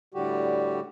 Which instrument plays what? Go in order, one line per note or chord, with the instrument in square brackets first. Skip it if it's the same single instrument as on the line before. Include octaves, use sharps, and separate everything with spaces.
[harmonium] A2 D3 G3 F#4 G4